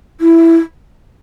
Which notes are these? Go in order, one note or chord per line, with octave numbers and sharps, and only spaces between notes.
E4